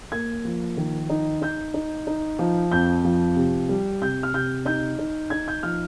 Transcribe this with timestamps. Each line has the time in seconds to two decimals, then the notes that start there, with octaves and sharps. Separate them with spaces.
0.12 A#3 G#6
0.45 F3
0.77 D#3
1.09 D#4
1.42 D#4 G6
1.74 D#4
2.07 D#4
2.39 F3
2.72 F2 G6
3.05 F3
3.36 C3
3.69 G3
4.02 C3 G6
4.23 F6
4.34 C3 G6
4.65 D#4 G6
4.99 D#4
5.30 D#4 G#6
5.48 G6
5.63 F3 F6